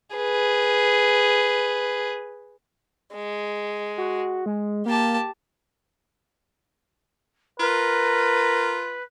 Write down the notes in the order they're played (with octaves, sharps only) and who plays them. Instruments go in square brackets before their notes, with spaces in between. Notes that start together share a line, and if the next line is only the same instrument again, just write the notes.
[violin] G#4 B4
[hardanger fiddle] G#3
[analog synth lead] F#4
G#3
[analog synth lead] A#3 [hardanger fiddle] G4 A5
[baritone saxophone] F4 [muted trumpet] A#4 [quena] B4